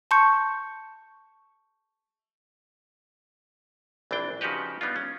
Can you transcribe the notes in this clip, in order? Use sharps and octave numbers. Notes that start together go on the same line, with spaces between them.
A5 C6 C#6 G6 C#7
A#1 E3 C4 D4 G5
C#3 F3 D#4 F#4 G4 B4
G3 B3 D4 D#4 F4
C#4